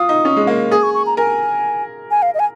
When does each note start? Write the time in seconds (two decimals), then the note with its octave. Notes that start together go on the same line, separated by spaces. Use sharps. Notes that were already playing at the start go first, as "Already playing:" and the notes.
Already playing: F4 D#6
0.09 D#4
0.25 C#4
0.36 G#3
0.47 A#3
0.71 G#4 D#6
0.83 C#6
0.94 C#6
1.06 A#5
1.17 A#4 G#5
2.11 G#5
2.22 F5
2.34 D#5
2.39 G#5